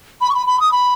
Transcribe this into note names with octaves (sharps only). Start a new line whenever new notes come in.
B5
C#6
B5
B5
D#6
B5